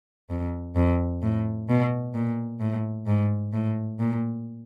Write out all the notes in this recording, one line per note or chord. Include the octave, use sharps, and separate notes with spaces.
F2
F2
A2
B2
A#2
A2
G#2
A2
A#2